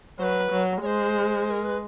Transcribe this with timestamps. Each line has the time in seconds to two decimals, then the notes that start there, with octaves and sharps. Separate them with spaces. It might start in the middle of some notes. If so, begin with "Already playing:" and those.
0.19 F#3 C5
0.23 B4
0.51 F#3
0.82 G#3 C#5
0.86 C5
1.50 A#4
1.64 B4